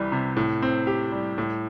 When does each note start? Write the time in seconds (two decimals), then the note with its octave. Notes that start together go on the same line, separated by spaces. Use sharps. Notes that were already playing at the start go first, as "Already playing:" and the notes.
Already playing: C2 E3 G3
0.12 C3
0.37 A2
0.62 C4
0.87 G4
1.12 G3
1.38 A2